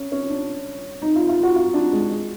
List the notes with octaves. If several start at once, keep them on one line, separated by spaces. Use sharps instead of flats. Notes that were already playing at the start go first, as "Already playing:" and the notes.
Already playing: C#4
C#4
D4
D#4
F4
F4
F#4
F4
D4
G#3
G#3